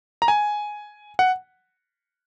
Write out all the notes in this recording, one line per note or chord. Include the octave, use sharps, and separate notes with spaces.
A#5
G#5
F#5